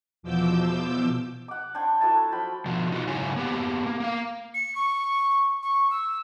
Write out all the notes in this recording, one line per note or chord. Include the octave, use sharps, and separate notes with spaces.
E2 B2 F3 D6 E6 G6
F#5 D6
D4 C5 C#5 G5
F#3 A3 E4 A5
F3 G5 B5
B2 F3
D#4 F4 F#4
G#2 C#3 F#3 E4 C#5 G#5
A#3 B3 G4
A#3
A#3 F5
C#7
C#6
C#6
E6